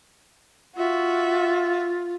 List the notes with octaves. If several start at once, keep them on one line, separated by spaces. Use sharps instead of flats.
F4 F#4 E5